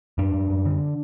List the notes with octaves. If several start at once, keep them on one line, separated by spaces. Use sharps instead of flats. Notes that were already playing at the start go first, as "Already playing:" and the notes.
F#2 D4
F#2
F#2
D3